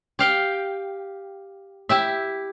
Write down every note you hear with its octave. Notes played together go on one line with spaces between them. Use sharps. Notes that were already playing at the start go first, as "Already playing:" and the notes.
G4 F5 G5
E4 G4 E5